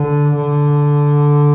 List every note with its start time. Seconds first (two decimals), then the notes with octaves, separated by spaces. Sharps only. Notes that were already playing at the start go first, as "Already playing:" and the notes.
Already playing: D3
0.37 D3